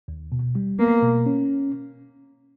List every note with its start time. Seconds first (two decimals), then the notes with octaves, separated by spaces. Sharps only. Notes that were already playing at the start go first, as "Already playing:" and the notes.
0.08 D#2
0.32 B2
0.55 G3
0.79 A#3 B3
1.03 B2
1.26 C#4